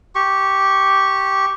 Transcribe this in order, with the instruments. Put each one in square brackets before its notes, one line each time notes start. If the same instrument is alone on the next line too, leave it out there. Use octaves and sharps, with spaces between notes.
[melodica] G4 C#6